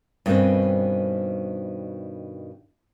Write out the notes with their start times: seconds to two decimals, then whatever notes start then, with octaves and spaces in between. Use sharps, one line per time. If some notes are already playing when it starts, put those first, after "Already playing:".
0.26 G2 B2 D#3 A3 C4 C#4